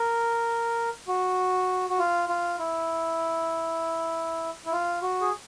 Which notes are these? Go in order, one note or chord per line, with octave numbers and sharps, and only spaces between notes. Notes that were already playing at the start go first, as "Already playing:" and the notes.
Already playing: A#4
F#4
F#4
F4
F4
E4
E4
F4
F#4
G#4